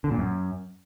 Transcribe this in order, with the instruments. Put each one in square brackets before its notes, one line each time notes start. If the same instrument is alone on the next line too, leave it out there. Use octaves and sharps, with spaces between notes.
[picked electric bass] D3
A#2
F#2